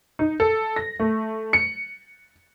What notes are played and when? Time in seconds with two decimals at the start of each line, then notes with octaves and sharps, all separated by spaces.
0.19 D#4
0.40 A4
0.76 A#6
1.00 A3
1.53 C#7